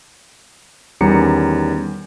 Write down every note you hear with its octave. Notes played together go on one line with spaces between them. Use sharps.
E2 D#3 G3 C#4 A#5 C#7